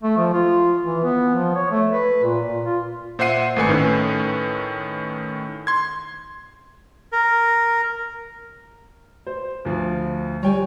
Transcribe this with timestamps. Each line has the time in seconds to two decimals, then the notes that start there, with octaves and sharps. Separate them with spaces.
0.03 A3
0.17 F3
0.34 F4
0.85 E3
1.04 B3
1.35 F3
1.56 C#5
1.72 A3
1.92 B4
2.23 A#2
2.48 A#2
2.64 F4
3.19 A#2 C5 E5 F#5 C7 D#7
3.56 G#1 A3 B4 G#5 C#7
3.69 A2 D#3 C#4 A4 B4
5.67 C6 G#6
7.12 A#4
9.27 C5
9.65 D2 F3
10.43 G3 C#5 G5 G#5